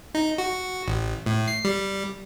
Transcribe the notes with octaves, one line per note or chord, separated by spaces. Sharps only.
D#4
F#4
A1
A2
C7
G3